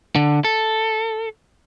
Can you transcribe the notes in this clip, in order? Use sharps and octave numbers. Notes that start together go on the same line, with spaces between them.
D3
A4